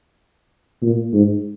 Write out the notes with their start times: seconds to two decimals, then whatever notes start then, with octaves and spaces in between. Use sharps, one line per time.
0.83 A#2
1.14 G#2